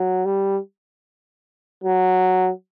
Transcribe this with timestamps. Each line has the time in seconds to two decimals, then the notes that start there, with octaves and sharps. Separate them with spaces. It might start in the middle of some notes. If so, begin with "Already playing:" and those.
Already playing: F#3
0.25 G3
1.83 F#3